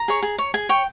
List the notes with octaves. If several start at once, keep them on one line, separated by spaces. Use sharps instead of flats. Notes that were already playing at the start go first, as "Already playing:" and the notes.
Already playing: A#5
G#4 C#5
G#4
C#5
G#4 G#5
C#5 G5